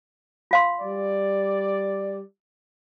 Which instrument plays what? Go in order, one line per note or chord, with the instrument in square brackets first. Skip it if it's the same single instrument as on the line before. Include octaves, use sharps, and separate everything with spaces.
[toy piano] F4 F5 C6
[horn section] G3 D5